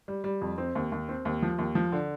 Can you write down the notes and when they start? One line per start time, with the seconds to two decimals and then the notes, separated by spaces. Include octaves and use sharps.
0.08 G3
0.24 G3
0.42 F2
0.58 C4
0.75 D#2
0.92 D#2
1.09 C4
1.25 D#2
1.42 F3
1.58 D#2
1.75 F3
1.92 D3